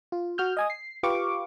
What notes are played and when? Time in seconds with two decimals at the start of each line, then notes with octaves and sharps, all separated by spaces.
0.12 F4
0.38 F#4 F6 G6
0.57 D#5 G#5 D#6
0.70 C7
1.03 F4 G4 B4 F5 C#6 D6